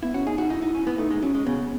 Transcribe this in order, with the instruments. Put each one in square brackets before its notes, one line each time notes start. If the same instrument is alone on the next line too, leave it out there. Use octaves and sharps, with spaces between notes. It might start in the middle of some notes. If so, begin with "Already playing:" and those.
[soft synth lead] B3 [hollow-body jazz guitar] E4
[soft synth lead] C#4 [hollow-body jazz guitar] F#4
[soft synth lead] D#4 [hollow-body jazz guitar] G#4
[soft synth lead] D#4 [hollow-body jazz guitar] F#4
[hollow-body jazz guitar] D#4 [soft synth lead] E4
[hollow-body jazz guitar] D#4
C#4
B3
[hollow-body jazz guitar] A3 [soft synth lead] D#4
[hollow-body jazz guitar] G#3
[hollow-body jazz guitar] F#3 [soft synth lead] C#4
[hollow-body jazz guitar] G#3
[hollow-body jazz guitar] C#3 [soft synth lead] B3